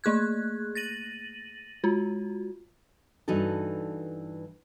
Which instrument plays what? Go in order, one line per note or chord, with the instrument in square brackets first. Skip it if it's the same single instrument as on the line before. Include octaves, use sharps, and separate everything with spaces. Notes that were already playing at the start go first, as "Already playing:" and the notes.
[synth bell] A3 A#3 G#4 F#6 G#6
A6 A#6 D#7 F#7
G#3 F4 F#4
[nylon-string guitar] G2 E3 D#4 F#4 A4